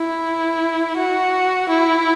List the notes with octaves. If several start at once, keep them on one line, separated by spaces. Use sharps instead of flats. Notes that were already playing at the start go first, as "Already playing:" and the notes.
Already playing: E4
F#4
E4